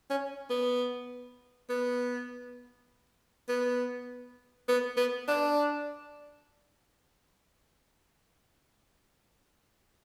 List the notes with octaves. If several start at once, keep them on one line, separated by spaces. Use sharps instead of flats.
C#4
B3
B3
B3
B3
B3
D4